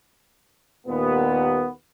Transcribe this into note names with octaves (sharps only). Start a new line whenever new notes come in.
D#2 A#2 G3 B3